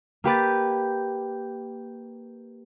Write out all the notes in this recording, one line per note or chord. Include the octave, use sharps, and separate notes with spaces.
A#3 G4 B4 A6